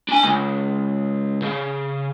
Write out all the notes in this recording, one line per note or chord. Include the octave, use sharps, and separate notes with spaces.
D4 G#5
C#2
C#3